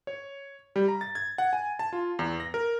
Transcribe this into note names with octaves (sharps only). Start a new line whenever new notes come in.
C#5
G3
A#5
A6
G#6
F#5
G#5
A5
F4
E2
A#6
A#4